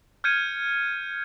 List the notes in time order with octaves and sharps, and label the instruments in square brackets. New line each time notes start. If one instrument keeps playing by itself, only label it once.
[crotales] F6 G6 G#6 C#7 D#7